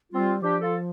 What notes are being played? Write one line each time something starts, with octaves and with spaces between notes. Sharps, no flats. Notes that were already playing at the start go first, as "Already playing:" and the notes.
G3 C4 F4
F3 D4 G4
F4 A4